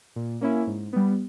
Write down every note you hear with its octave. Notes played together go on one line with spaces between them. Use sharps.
A#2
A#3 C#4 E4
G#2
G3 B3